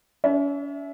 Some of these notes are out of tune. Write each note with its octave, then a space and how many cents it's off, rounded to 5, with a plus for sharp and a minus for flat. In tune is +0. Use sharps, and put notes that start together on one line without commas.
C#4 +40 E5 +0